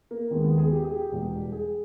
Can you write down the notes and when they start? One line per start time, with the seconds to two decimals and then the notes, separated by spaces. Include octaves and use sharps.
0.11 A#3
0.31 D#2 D#3 G#3 B3
0.44 B3
0.58 G#4
0.72 G4
0.84 G#4
0.96 G4
1.12 E1 E2 B2 G3
1.52 G#4